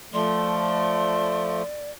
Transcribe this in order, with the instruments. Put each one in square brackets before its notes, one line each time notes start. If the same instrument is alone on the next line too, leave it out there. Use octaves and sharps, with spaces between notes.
[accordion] F3 A3 [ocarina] D5 [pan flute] C6